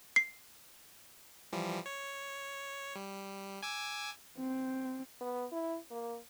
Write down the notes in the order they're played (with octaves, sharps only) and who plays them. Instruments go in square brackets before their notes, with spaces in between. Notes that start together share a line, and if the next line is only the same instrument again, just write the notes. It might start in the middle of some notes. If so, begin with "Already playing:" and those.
[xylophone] C7
[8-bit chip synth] E3 F3 G3
C#5
G3
G#5 D6 E6
[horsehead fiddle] C4
[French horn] B3
E4
A#3